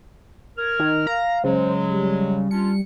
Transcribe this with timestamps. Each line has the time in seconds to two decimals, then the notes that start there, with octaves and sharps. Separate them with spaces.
0.57 A#4 F6 G#6
0.79 D#3
1.07 F5 A#5
1.44 C#3 F#3 G#3 C5
1.88 G3
2.51 C#4 D4 F4 C#7